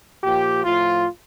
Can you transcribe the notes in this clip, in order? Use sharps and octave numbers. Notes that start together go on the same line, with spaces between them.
A#2 F3 G4
A2 F3 F4